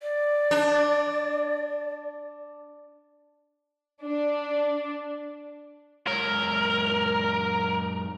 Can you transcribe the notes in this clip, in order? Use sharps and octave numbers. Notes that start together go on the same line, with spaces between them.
D5
D4
D4
F#2 G#3 A#4 C#5